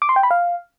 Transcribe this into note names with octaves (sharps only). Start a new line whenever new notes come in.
D6
C6
G5
B5
F5